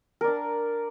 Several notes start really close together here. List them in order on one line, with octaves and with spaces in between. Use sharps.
A#4 D5 D4